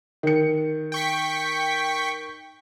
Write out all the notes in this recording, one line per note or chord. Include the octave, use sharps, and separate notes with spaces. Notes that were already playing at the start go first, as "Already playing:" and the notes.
D#3 C#7
G5 C#6 B6